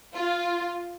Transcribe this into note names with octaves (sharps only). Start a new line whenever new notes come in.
F4